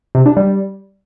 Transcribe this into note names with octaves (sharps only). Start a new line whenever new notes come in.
C3
D4
G3